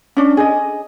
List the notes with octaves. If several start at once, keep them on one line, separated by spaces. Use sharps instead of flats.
C#4 D4
G#4 D#5